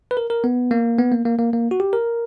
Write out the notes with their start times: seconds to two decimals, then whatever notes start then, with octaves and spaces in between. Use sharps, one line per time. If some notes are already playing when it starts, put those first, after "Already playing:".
0.11 B4
0.17 A#4
0.30 A#4
0.44 B3
0.71 A#3
0.98 B3
1.12 A#3
1.26 A#3
1.38 A#3
1.53 A#3
1.71 F#4
1.80 G4
1.93 A#4